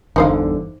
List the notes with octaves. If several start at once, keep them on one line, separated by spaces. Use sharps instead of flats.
G1 E2 D3 D#4 C5 F5